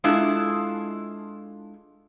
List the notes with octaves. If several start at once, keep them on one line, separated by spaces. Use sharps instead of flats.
G#3 D4 E4 F4 G#4 A4